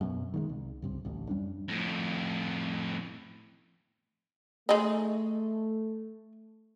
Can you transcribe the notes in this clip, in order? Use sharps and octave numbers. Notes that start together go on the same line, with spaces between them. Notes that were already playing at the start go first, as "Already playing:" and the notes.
F#2 B2
D#3 G3 G#3
C2
C#2 G2 C3
A1 D2 D3
F#2 G3 C#4 D4
F2 A2
G#3 A3 D#4